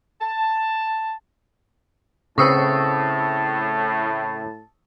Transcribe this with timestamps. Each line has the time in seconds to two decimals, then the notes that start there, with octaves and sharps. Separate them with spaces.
0.21 A5
2.38 A2 C#3 C4 B4 A5 C#6 D#6 E6